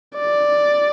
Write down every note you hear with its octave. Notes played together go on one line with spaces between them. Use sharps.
D5